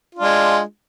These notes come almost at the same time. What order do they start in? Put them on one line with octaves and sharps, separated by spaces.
F4 D4 G#3